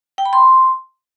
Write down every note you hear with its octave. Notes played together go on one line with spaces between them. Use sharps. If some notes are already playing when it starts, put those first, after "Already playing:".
G5
B5
C6